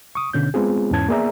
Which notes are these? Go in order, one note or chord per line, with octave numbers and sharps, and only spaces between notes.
C#6 D#6
B2 D3 C#4 G6
G#3 B3 C4 F4 G#4
E2 G#2 E3 C#4 A5 G#6
A#3 B3 G#4 D5 E5 A#5